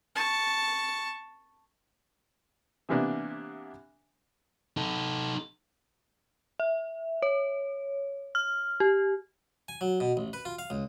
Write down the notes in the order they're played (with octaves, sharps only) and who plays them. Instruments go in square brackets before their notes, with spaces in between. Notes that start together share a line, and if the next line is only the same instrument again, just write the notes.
[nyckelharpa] A5 C#6
[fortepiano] C3 E3 A#3 B3 D4
[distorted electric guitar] D#4 A4
[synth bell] E5
C#5
F6
G4
[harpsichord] G#5
F#3
B2
A1
B4
F4
F5
C#2